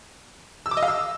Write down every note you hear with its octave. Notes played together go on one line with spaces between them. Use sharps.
E6
D6
D#5
F5
E6